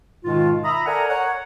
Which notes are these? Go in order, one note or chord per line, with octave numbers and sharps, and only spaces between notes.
G#2 B2 D#3 G#3 F4
E5 A#5 B5 D#6
A4 A#4 D5 F#5 G#5 A#5
C#5 F#5